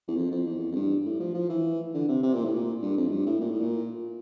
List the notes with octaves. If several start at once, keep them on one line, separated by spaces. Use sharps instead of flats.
E2
F2
F2
E2
F2
G2
A2
F3
F3
E3
D3
C3
C3
A#2
A2
A#2
G2
F2
A2
G2
A2
A#2
A2
A#2